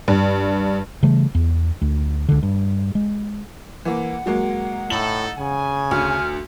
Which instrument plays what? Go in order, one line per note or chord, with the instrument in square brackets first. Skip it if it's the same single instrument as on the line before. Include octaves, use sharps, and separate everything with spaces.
[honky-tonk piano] G2
[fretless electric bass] C#3 E3 G3 A3
E2
D2
C#2 D3
G2
G#3
[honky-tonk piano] E3 A#3 [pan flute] F#5
[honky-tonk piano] F#3 G#3 A#3
[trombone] A2 [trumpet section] D#4 E4 A4 [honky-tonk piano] F#7
[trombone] C#3 [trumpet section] G#5
[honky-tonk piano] D2 [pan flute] F6